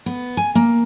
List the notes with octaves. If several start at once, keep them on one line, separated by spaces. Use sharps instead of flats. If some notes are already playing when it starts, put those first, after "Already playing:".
B3
G#5
A#3